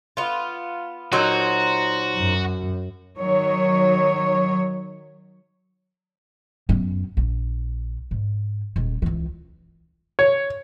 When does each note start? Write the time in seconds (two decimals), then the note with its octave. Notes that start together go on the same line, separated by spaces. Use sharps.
0.17 B3 F4
1.12 A#2 F#3 D#4 F#4 C5
2.16 F#2
3.20 D#3 F#3 C#5
6.69 F#2 B3
7.17 A#1
8.11 G#2
8.76 D#1 G#3
9.02 C#2 E3
10.19 C#5